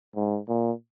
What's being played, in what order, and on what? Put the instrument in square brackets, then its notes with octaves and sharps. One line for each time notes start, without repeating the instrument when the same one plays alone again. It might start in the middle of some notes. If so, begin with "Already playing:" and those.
[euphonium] G#2
A#2